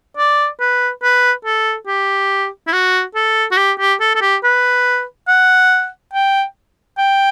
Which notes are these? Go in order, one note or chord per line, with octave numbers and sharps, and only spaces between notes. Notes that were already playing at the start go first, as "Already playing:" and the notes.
D5
B4
B4
A4
G4
E4
F#4
A4
F#4
G4
G4
A4
A4
G4
B4
F#5
G5
G5